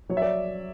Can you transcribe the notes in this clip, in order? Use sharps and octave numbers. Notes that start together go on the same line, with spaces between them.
F#3 C#5
E5
D5